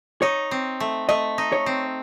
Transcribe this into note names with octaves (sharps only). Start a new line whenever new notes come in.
D#4 C#5
C4
A3
A3 D#5
D#4
C#5
C4